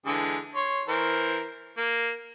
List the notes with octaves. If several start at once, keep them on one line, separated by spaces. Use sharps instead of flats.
D3 E3 G#3
C#5 C6
E3 A#4 C5
A#3